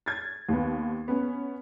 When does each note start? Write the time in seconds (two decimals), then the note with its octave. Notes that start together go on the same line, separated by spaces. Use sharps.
0.06 G#6 A6
0.49 D#2 B3
1.08 B3 C#4